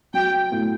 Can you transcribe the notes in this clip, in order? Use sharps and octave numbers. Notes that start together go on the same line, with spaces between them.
F#3 G5
A2